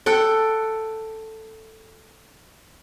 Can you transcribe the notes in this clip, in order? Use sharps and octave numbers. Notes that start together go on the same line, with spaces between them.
A4 F#5 G5